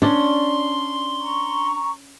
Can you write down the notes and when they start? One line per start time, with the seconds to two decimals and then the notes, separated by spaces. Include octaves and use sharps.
0.02 C#4 D4 D5 C6
1.20 A#5 C#6